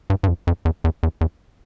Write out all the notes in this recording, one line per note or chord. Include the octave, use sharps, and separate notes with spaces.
G2
G2
F2
F2
E2
E2
E2
E2